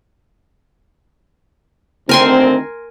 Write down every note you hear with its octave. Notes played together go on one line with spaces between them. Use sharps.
D2 D#3 C4 A#4 G#5 C6